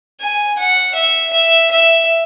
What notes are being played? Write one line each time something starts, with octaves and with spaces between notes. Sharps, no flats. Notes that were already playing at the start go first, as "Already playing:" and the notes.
G#5
F#5
E5
E5
E5